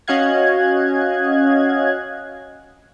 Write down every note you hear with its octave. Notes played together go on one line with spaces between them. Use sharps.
C#4 F#4 D#5 F5 F#6 G#6